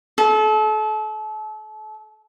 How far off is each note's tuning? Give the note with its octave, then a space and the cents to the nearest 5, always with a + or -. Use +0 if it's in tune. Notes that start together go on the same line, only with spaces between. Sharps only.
A4 -35